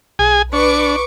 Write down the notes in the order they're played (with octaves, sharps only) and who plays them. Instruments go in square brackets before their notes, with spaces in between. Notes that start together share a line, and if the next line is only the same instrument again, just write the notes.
[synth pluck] B1 [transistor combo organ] G#4 G#5
[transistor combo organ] D4 [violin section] B4 C#6 D6